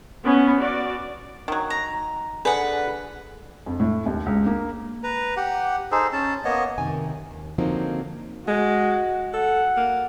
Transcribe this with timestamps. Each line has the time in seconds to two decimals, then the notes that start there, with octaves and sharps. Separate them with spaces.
0.23 B3 C#4 B4
0.59 F#4 D5
1.48 D#3 F#3
1.70 A#5
2.45 D3 G#4 B4 F#5
3.66 F2
3.80 A2
4.06 D#2
4.26 C#2
4.46 A#3
5.04 B4 A#5
5.37 G4 F#5
5.92 D#4 G#4 A4 C5
6.13 C#4 A5
6.45 A#3 B3 C#5 D#5
6.78 F#2 C3 D#3 G#5
7.31 D#2
7.58 D3 F3 F#3 A#3 C4 D#4
8.48 G#3 F#4
9.34 A4 F#5
9.76 A#3